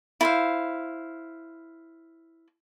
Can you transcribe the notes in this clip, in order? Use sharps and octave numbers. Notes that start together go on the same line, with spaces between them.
E4 C5 F5